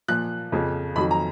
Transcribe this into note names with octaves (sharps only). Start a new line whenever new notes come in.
A#2 F3 F#6
F2 C#3 F3
F2 D#3 F#3 B5
A#5